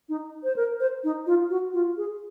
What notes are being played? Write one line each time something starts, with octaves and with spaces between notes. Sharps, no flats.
D#4
C5
A#4
C5
D#4
F4
F#4
F4
G#4